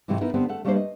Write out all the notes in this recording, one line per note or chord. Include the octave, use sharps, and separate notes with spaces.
G#2 C3 E3 F#3 A3
B3 D#4 E4 A#4
D3 B3 C4 G4 A#4 C5
A3 A4 F#5
G3 A3 A#3 D4 B4 C5
D#5